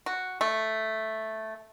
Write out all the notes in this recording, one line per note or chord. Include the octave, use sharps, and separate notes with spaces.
F#4
A3